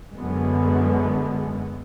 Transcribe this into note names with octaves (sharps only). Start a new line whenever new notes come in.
F#2 D3 G#3 B3